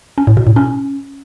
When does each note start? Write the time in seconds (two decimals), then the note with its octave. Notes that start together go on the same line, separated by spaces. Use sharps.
0.18 C#4
0.27 A2
0.37 B2
0.47 A2
0.56 C#4